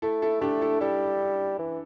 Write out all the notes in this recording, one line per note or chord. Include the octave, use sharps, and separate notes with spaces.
A3 E4 A4
E4 A4
A3 D4 G4
E4 A4
G3 E4 A4
E3